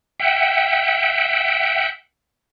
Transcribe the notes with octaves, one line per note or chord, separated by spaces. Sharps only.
E5 F#5 G5